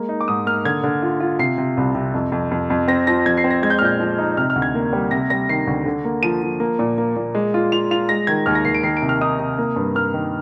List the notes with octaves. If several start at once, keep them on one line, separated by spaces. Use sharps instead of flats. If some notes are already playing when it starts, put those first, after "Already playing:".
Already playing: G#3 A#3
D#4
D6
G#2 D#6
A#3 F6
D3 G#6
D3
F4
F4
C3 C7
C3
C2
C3
F2
F2
F2
F2
C4 A#6
F3 A#6
F2 G#6
C7
C4
A#6
G#3 G#6
G6
F6
A#2 G6
F3
D#4
C3 F6
F6
D2
G#6
A#3
G3
C3 A#6
G3 A#6
D#3 C7
D2
D3
A#3
F3 D#7
F3
A#3
A#2
A#3
A#2
G#3
F4
F4 F7
F4 F7
G#3 A#6
D#3 G#6
D#2 F6
A#6
D#2 C7
D7
D#3 C7
D7
C3
F6
D#4 D#6
C3
A#3
G2
A#3 F6
D#3